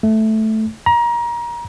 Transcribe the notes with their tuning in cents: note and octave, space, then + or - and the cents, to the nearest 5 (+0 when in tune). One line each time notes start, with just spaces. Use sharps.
A3 -5
A#5 +30